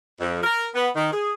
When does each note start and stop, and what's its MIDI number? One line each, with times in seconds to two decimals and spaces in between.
0.20 0.43 41
0.43 0.67 70
0.74 0.89 59
0.95 1.12 51
1.13 1.33 68